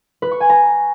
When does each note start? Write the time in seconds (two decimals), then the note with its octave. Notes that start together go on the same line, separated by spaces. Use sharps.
0.22 B4
0.31 C#6
0.40 G#5
0.50 A#5